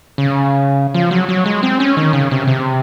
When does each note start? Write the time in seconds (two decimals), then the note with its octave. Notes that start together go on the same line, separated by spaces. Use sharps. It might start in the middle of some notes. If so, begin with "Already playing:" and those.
0.18 C#3
0.94 F3
1.11 F#3
1.29 F#3
1.46 G#3
1.63 C4
1.80 C#4
1.97 D#3
2.13 C#3
2.31 C3
2.47 C3